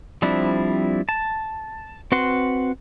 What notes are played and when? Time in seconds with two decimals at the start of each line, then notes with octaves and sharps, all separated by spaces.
0.22 F3 G3 C4 D4 E4
1.09 A5
2.12 C4 F#4 B4 F#5 C6